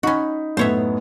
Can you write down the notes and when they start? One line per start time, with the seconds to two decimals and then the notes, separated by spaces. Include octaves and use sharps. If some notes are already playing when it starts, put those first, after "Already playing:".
0.03 C#4 D#4 F#4 B5
0.57 F#2 A2 B3 C5 C#5 E5